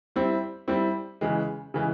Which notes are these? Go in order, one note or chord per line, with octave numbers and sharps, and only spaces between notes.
G3 C4 E4
G3 C4 E4
C#3 E3 G#3
C#3 E3 G#3